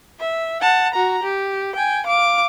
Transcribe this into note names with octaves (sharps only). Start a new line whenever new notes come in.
E5
F#5 A5
F#4 A#5
G4
G5 G#5
F5 D6